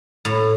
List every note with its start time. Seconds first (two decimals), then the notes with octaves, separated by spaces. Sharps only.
0.25 A2